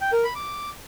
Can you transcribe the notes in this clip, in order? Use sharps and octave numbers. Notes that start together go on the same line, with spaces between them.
G5
A#4
B5
D6